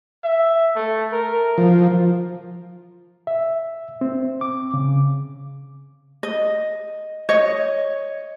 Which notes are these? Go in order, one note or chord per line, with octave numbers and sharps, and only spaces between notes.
E5
A3
A#4
F3
E5
C4
D6
C#3
D#5
C#5 D#5